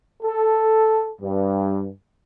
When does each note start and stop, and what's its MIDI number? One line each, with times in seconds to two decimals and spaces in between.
0.23 1.12 69
1.21 1.90 43